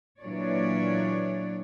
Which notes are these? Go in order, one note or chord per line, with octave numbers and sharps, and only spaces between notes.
A#2 E3 F#3 D4 C#5 D5